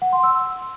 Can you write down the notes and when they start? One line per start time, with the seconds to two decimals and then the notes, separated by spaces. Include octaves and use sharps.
0.02 F#5
0.13 C6
0.23 E6